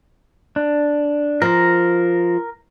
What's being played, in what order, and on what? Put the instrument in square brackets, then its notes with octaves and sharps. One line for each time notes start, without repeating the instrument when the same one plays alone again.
[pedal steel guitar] D4
[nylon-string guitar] F3 [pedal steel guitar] A#4 A#5